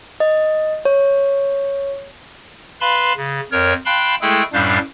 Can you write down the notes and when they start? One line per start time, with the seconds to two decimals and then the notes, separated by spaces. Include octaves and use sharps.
0.20 D#5
0.85 C#5
2.81 B4 F5 A5 B5 C6
3.17 C#3
3.52 F2 A#4 C#5
3.85 F5 G5 A5 B5 C6 F#6
4.21 G#3 A3 E4 G#4 A4 G5
4.53 F#2 A2 G3 D4 F5 G6